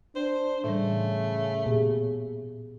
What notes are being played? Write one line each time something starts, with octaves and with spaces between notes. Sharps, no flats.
D4 C5
A2 C#3 E3 G3 A3
A#2 B3 G4 G#4